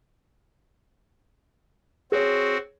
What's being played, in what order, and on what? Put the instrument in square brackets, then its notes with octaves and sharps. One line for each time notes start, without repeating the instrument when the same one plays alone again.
[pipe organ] C4 F#4 [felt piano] G#4 C#5